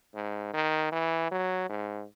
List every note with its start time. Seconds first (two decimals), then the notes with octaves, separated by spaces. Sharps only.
0.14 G#2
0.54 D#3
0.92 E3
1.31 F#3
1.69 G#2